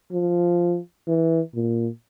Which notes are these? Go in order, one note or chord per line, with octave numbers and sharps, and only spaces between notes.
F3
E3
A#2